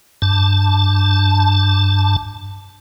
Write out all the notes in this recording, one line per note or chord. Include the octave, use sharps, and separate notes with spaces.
G2 A5